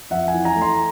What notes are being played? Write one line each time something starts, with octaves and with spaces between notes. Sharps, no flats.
F2 E5 F#5
F#5 G#5
E3
G#5 A#5
A3
A#5 C6